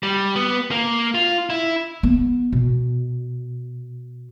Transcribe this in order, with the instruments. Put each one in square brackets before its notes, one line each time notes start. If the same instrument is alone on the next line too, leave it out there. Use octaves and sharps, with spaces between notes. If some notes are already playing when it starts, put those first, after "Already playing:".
[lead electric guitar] G3
B3
A#3
F4
E4
[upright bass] B3
B2